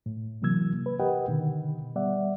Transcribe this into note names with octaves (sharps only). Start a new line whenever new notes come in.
A2
C3 E3 F#3 A#3 E6 G#6
B4
G4 A#4 B4 D#5 F#5 G5
B2 D3 D#3
G3 B3 D5 E5 F#5